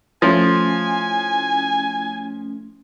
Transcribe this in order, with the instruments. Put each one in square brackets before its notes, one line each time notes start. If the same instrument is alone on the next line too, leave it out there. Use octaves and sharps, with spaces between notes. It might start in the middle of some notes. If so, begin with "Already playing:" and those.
[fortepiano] F3 [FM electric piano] A3 C#4 E4 [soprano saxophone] G#5